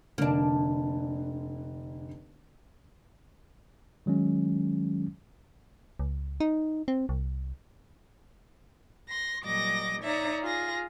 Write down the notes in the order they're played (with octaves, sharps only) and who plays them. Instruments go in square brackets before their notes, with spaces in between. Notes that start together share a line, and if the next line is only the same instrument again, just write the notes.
[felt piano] F1 D3 [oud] A#3 D4
[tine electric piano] D#3 F#3 G#3 C#4
[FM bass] C#2
D#4
C4
C2
[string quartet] C6 A#6
A#2 F#3 G3 D#5 D6 A#6
D#4 C#5 D5 E5 A#5
F4 G#4 A#6